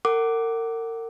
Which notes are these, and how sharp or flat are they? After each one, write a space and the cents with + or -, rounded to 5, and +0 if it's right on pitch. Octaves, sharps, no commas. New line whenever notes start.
A#4 -35 F#5 +25 D6 +0